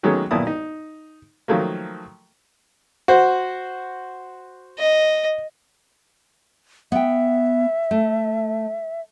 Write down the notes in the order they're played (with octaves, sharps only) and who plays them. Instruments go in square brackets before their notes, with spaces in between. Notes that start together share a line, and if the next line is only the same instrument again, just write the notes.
[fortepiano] D#3 F#3 G#3 A3 B3 C#4
B1 A#2 D#3 E4 A5 D#6
D#4
D#3 F3 F#3 A3 A#3
F#4 C5
[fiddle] D#5
[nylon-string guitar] B3 G5 [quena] E5
[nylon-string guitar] A3